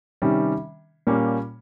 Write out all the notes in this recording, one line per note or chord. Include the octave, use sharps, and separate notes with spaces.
C3 D#3 G3 C#4
A#2 G3 A#3 C#4